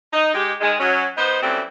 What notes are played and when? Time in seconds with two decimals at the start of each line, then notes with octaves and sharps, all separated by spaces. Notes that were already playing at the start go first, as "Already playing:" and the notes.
0.13 D#4
0.34 G#3 G4
0.60 D#3 G#3
0.80 F#3 C#4
1.17 B3 D#4 C5
1.43 F#2 E3 G3 A3 C4